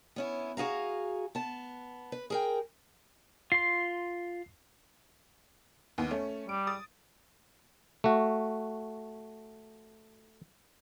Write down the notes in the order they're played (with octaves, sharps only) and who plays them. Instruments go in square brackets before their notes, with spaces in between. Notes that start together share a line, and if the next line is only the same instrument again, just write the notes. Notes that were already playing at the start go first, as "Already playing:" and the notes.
[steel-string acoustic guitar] B3 C#4 E4
F#4 G#4 F5 A#5
B3 A5
B4
G#4 A#4 G5
[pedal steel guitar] F4 C6 [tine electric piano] C7
[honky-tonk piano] D#2 B3
A3 C#4
[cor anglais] G3 [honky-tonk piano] D7
[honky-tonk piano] D#6 A6
[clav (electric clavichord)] A3 F#4